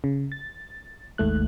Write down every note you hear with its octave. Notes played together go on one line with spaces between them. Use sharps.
C#3
A6
G#1 D#2 G#2 A3 F#6